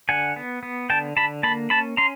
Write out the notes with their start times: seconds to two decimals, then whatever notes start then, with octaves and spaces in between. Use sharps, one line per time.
0.09 D3 F#5 G#5
0.36 B3
0.63 B3
0.90 D3 G5 A5
1.16 D3 A5 B5
1.43 A#3 A5 B5
1.70 C#4 A5 B5
1.97 C#4 A#5 C6